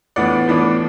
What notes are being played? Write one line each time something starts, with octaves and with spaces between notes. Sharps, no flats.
A2 E3 B3 D4 D5 F#5
A2 E3 B3 D4